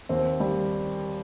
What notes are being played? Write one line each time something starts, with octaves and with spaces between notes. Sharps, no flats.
D#2 C4
G3